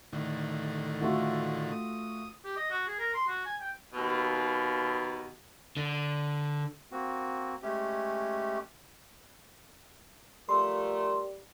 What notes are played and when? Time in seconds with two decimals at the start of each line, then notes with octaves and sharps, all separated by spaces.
0.13 A2 D3 D#3
1.01 A3 F4 F#4
1.72 D#6
2.44 G4
2.57 D#5
2.70 F#4
2.87 G#4
2.99 A#4
3.14 C6
3.27 F#4
3.45 G#5
3.60 G5
3.94 D#2 B2
5.77 D3
6.92 A#3 C4 F#4
7.63 G#3 A3 C#4 G4
10.49 F3 G3 A3 A#4 C6